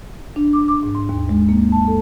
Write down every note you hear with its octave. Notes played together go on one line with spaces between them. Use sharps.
D4
D6
D6
G#2
C6
D#2
G#3
A#3
A5
A4